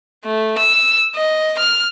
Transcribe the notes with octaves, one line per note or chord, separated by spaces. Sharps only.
A3
E6
D#5
F6